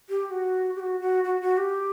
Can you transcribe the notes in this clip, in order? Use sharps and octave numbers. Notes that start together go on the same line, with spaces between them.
G4
G4
F#4
G4
F#4
F#4
F#4
F#4
G4